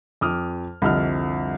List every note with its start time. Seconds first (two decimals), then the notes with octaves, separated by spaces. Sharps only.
0.21 F2 D6 D#6 F6
0.82 C2 F2 D3 D4 D#5 F6